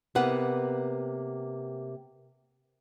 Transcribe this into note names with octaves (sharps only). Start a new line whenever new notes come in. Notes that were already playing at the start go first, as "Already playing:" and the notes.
C3 A#3 B3 F#5